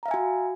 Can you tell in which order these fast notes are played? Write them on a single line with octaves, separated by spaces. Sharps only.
A#5 F5 E5 G#5 F#4